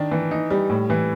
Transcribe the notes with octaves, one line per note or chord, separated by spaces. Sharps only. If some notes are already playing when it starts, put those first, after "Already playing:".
Already playing: D#3 D4
E3
D#4
G3
A2
E3